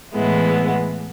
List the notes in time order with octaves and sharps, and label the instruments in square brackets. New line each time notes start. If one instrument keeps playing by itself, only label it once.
[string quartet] A2 E3 G#3 B3 E4